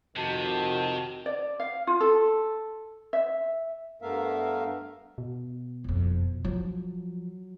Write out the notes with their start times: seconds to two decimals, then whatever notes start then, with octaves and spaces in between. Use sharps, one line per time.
0.17 F2 C3 D#3 F#4 A5
1.26 D5
1.60 F5
1.87 F4
2.00 A4
3.13 E5
4.02 G2 A3 B3 A#4 E5 F5
5.18 B2
5.84 F#1 F2
6.45 F3 F#3 F4